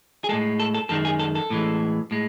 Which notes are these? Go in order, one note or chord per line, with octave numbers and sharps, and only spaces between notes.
G#4
A2 G#3 A4
A4
A4
F#2 D#3 G#3 A4
G#4
A4
A4
A2 E3 G#3
A2 G#3